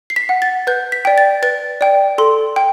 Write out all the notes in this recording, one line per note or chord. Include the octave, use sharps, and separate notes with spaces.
C7
B6
F#5
A6
B4 G6
B6
D5 G5
A6
B4 A6
D5 G5
A4 C6
G5